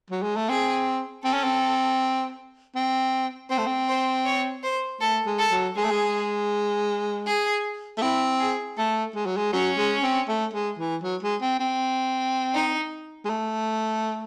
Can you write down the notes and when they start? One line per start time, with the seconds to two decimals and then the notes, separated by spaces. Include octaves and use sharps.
0.10 F#3
0.22 G#3
0.36 A3
0.49 C4 G#4
1.25 C4 A4
1.34 C#4
1.44 C4
2.75 C4
3.50 C4 C5
3.58 A3
3.66 C4
3.88 C5
4.26 C#5
4.64 C5
5.01 A3 A4
5.26 G#3
5.39 A4
5.51 F#3
5.76 G#3 G#4
5.84 A3
5.91 G#3
7.27 G#4
7.97 A3
8.02 C4 E4
8.40 G#4
8.78 A3 A4
9.15 G#3
9.26 F#3
9.37 G#3
9.53 F#3 C#4
9.78 G#3
10.03 C4
10.28 A3
10.53 G#3
10.78 E3
11.03 F#3
11.22 G#3
11.41 C4
11.59 C4
12.55 D#4
13.25 G#3
13.29 A3